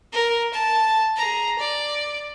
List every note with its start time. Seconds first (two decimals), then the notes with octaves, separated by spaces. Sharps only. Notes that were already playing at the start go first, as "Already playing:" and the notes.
0.13 A#4
0.53 A5
1.16 G#4 A#5
1.59 D5